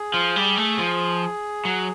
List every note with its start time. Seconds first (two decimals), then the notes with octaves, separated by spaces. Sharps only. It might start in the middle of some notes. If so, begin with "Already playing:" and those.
Already playing: G#4
0.14 F3
0.36 G3
0.57 A3
0.79 F3
1.65 F#3